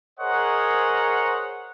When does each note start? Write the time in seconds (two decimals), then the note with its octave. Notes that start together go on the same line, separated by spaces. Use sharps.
0.20 G#4 A#4 C5 C#5 D#5 F#5